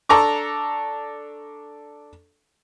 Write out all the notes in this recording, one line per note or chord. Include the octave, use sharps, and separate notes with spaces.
D4 A4 A#5 C#6 D6